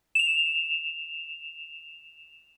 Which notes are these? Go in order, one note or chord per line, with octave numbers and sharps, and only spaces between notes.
E7 F7